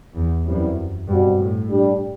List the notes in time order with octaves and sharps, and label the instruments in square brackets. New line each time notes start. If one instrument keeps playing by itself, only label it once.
[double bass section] E2
[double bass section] F#2 [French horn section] E3 G3 C4 E4
[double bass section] G2 [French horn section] B2 G3 C4 F#4
[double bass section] A2
[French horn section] G3 D4 G4